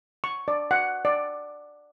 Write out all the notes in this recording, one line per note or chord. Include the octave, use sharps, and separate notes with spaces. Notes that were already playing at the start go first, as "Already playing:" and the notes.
C#6
D5
F#5
D5